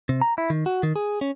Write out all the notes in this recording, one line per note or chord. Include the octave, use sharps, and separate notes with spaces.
C3
A#5
E4
D#3
F#4
D#3
G#4
C#4